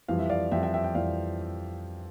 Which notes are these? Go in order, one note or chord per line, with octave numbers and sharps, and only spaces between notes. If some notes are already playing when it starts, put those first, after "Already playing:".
F2 E3 G3 F5
E5
D5 F5
F2 E3 G3 E5 G5
E5 G5
E5 G5
E5 G5
F2 E3 G3 D5 F5